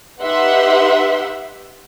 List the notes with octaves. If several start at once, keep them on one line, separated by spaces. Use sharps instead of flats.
D#4 G4 B4 E5 F#5 C6